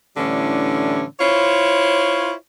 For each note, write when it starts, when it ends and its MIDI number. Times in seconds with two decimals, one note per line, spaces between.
0.17 1.03 45
0.17 1.03 50
0.17 1.03 52
0.17 1.03 55
0.17 1.03 61
0.17 1.03 62
1.20 2.32 64
1.20 2.32 65
1.20 2.32 72
1.20 2.32 73